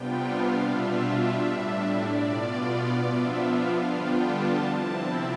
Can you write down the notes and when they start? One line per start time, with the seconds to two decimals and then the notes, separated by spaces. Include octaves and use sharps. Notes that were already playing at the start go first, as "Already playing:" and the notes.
Already playing: C3 G3 B3 D4 F4 G5
0.25 F5
0.65 B2 G3 D4 F4 E5
1.05 E5
1.45 A2 G3 D4 E5
1.85 D5
2.26 B2 B3 F4
3.06 F3 B3 D4 F4 E5
3.46 F5
3.86 D3 G3 B3 D4 F4 G5
4.26 A5
4.66 C3 F3 C4 E4 A5